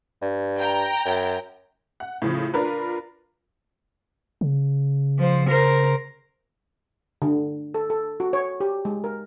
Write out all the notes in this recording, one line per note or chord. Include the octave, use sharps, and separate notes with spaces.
G2
G5 A#5
F#2
F#5
A2 C#3 F3
D4 F4 A#4 B4
C#3
F3 C5
A#4 C5
D3
A4
A4
F#4
C#5
G4
G#3
A#4